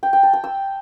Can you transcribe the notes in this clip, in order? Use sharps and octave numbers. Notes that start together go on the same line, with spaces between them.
G5
G5
A5
G5
E6